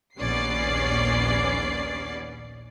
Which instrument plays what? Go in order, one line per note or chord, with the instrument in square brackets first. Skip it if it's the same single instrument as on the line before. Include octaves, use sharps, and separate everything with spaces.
[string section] A#1 D#2 B3 C#4 D5 C7